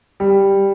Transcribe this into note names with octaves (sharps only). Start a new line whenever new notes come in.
G3